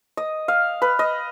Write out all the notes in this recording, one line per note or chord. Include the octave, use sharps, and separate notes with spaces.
D#5
F5
B4
D#5